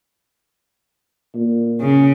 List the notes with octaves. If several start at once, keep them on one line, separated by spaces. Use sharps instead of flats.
A#2
C#3